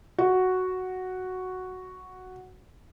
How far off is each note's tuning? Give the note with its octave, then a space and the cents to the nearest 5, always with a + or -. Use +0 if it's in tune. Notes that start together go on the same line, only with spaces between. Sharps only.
F#4 +0